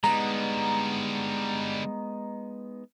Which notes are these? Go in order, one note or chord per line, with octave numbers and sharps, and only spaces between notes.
D3 G3 G#3 B3 D#4 A#5